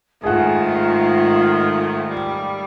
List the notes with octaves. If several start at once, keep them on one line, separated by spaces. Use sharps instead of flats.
G#2 D#3 A3 F4 G#4 F#5
G3